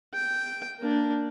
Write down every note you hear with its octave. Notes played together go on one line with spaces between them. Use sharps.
G5
A#3 D4